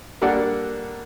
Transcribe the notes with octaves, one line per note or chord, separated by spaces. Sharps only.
G3 A#3 D4 A4 D5 F#5